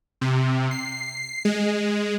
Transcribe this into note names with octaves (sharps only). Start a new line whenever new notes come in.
C3
C7
G#3